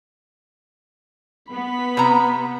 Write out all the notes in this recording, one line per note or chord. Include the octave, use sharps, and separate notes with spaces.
B3 B5
C3 A#5